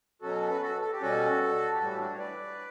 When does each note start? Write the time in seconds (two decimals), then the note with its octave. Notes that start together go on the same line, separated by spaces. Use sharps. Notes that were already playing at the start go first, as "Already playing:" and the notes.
0.22 B2 F#3 C#4 F#4 A4
0.50 B4
0.62 F#4 A4
0.81 A4
0.92 G4
1.01 B2 G3 C#4 F#4 A4
1.73 G4
1.79 A2 E3 G3 F#4 A4
1.91 G4
1.99 D4 F#4
2.14 C#5
2.18 B4 D5